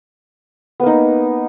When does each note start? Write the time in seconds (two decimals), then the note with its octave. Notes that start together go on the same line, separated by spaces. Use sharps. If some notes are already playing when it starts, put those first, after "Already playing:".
0.80 B3
0.83 A#3
0.86 D#4